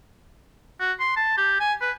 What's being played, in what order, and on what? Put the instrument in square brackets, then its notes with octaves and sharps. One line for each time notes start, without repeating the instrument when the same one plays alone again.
[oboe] F#4
C6
A5
G4
G#5
B4